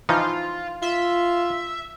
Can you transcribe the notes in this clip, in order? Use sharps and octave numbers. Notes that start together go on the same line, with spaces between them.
E3 F3 D#4 F4
F4 E5